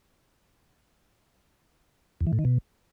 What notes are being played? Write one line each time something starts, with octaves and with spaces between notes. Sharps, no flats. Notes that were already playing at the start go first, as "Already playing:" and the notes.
E2
E3
A2
D#3
B2